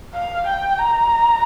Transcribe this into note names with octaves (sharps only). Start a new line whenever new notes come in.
F5
G5
A#5